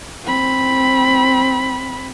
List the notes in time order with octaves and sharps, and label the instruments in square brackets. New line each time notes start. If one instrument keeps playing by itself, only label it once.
[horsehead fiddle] C4 B5